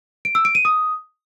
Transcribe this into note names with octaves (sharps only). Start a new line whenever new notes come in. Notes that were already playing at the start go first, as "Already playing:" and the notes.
D7
E6
D7
D#7
D#6